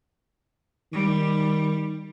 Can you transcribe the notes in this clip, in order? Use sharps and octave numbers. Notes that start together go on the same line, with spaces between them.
D#3 G3